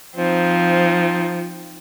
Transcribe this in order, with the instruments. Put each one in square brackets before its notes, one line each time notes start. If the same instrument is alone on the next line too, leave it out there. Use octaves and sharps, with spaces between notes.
[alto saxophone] F3 [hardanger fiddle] C4 D#4